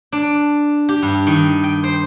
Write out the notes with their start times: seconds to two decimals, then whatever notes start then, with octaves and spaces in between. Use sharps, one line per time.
0.12 D4
0.89 G4
1.03 G2
1.27 D#3
1.63 G5
1.84 C5